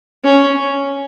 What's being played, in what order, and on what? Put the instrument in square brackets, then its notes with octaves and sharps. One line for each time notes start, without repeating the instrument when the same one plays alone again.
[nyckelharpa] C#4